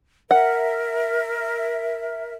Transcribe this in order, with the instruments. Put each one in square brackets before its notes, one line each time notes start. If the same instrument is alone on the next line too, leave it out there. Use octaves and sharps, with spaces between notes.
[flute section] A#4 E5 [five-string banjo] F#5